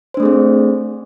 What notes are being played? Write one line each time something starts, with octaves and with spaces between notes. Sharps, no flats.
A3 C4 D4 G#4 C5